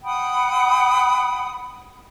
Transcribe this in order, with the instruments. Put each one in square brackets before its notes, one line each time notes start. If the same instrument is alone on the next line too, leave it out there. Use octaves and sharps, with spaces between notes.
[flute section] F#5 G5 B5 D#6